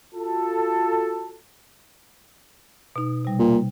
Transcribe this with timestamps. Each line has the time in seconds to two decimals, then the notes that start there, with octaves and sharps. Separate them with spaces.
0.15 F4 F#4 A4
2.96 B2 D#4
3.25 C3 G3
3.39 A#2